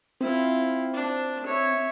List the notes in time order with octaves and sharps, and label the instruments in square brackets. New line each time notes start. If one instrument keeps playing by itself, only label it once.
[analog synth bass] C4 [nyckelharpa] E4 F4
[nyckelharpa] D4
C#5 E5